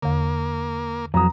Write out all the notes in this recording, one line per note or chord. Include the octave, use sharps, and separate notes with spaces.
E2 D3 A#3
F2 F#3 A#5 D#6